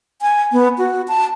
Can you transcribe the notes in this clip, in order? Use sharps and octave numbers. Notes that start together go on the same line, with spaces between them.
G#5
B3
F#4
A5